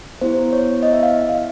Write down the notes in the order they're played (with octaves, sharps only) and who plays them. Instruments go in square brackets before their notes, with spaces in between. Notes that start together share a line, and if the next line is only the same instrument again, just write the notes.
[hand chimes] B3 E4 G4 C5
C#5
D#5
E5
F5
F5